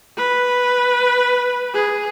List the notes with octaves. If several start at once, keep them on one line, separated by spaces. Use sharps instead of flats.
B4
G#4